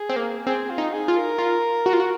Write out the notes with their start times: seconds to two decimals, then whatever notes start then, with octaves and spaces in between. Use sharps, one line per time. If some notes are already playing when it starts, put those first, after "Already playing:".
Already playing: G#4
0.09 C4
0.16 A#3
0.46 C4 G#4
0.70 F4
0.78 D#4
0.93 G#4
1.08 F4
1.16 A#4
1.38 F4
1.86 F#4
1.93 F4
2.00 F#4